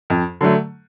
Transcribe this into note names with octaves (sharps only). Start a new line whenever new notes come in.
F2
D3 F#3 A3